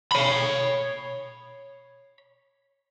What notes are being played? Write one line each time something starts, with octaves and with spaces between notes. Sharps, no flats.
C#5 B5